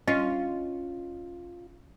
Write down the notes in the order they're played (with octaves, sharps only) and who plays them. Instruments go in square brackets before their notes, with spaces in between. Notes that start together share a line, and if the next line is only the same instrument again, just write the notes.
[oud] C#4 [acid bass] F4 [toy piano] D#5